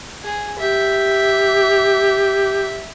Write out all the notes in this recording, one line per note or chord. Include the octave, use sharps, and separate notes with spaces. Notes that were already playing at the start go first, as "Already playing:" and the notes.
G#4
G4 E5